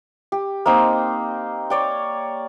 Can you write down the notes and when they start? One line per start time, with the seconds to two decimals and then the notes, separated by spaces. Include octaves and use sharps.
0.32 G4
0.66 A#3 C4 D#4 C5
1.70 C#5 D5 G5